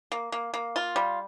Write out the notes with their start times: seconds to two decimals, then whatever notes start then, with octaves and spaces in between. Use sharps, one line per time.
0.12 A#3
0.32 A#3
0.54 A#3
0.76 F4
0.96 G3